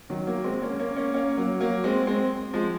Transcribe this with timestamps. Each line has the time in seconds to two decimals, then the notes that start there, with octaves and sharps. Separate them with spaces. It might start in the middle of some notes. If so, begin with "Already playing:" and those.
0.10 D#3 F#3
0.27 F#3 A#3
0.44 G#3 C4
0.62 A#3 C#4
0.79 A#3 C#4
0.96 A#3 C#4
1.14 A#3 C#4
1.37 F#3 A#3
1.60 F#3 A#3
1.84 G#3 C4
2.07 G#3 C4
2.53 F3 G#3